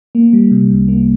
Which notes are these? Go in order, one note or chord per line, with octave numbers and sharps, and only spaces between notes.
A#3
G3
C3
C2
A#3